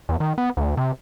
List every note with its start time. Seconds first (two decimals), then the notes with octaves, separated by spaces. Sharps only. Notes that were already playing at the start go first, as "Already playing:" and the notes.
0.09 E2
0.20 D#3
0.38 B3
0.57 D2
0.77 C3